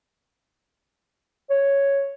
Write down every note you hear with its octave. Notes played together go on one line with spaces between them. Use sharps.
C#5